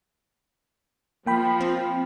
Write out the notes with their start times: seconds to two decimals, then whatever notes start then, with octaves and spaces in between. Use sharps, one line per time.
1.26 F3 A#3 G5 B5
1.61 C4